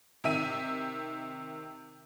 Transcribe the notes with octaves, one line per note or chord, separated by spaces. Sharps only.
C3 D#3 E5 D#7